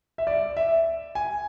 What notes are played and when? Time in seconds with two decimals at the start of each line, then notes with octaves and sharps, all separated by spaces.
0.18 E5
0.27 D5
0.57 E5
1.15 G#5